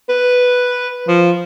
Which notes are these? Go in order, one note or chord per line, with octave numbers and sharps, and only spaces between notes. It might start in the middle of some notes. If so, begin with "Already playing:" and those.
B4
F3